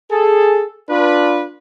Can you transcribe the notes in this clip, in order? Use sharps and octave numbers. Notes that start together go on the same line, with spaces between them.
G#4 A4
D4 F4 B4